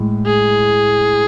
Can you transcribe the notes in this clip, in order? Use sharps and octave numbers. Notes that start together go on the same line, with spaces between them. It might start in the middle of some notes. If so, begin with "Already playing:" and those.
Already playing: A2 G#3
G#4